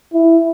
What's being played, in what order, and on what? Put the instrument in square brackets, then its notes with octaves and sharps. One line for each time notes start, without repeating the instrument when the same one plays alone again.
[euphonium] E4